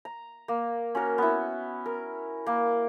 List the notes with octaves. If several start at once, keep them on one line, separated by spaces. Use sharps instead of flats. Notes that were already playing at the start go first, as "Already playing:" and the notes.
A#5
A#3
C#4 F#4 A#4
B3 E4
A#4
A#3